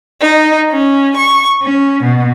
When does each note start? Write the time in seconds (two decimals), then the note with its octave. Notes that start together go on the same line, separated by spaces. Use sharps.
0.23 D#4
0.72 C#4
1.19 C#6
1.62 C#4
2.04 B2